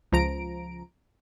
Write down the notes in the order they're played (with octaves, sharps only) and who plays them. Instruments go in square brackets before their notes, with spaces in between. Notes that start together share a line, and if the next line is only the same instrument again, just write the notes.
[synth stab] C#2 F3 A#5 D7